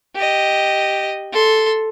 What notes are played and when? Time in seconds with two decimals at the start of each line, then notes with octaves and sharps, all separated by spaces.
0.15 G4 D#5
1.32 A4 C6